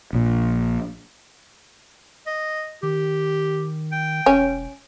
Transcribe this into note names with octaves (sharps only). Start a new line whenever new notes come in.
A#1 A#2
D#5
D#3 G4
G5
E1 C#4